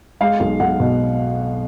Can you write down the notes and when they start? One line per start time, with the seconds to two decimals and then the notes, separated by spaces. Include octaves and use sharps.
0.21 G#3 F5
0.40 B1
0.60 B1 F#5
0.80 B2